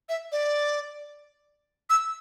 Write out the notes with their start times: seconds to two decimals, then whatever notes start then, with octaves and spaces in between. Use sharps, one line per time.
0.09 E5
0.32 D5
1.90 E6